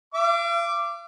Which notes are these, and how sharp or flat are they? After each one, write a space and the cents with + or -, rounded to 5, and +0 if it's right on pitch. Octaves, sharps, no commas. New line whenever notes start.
F5 -45 D6 +0